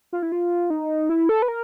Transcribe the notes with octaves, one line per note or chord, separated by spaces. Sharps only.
F4
E4
F4
D#4
E4
A4
B4
A#4